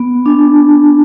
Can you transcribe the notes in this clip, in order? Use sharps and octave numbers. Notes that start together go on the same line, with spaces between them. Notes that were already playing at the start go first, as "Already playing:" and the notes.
Already playing: B3
D4